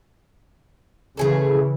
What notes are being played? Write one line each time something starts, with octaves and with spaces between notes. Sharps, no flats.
C#3 E3 A3 G#4 A4